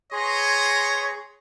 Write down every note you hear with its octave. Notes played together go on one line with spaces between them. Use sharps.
G#4 B4 C#5 D#5 A#5 C6